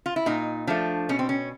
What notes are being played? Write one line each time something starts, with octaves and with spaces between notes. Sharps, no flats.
F4
E4
A#2 D#4
F3 A3 D4
B2 C#4
C4
C#4